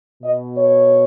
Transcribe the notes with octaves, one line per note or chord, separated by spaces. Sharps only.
B2 D#5
C#5